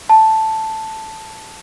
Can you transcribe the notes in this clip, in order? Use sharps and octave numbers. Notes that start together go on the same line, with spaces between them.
A5